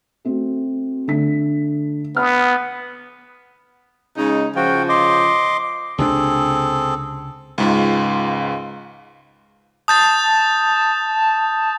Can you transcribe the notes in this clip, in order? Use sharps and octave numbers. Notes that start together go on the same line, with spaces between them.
A3 C4 F#4
D3 A3 B6
B3 D#6 F6
C#3 G#3 D#4
C#3 F3 F#4 G5
D#5 C6 D6
C#2 C3 C4 D4 G#4 A4
C#2 G#2 F4
A5 D#6 G6 A6